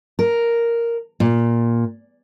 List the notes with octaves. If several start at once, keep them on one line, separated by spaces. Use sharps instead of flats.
A#4
A#2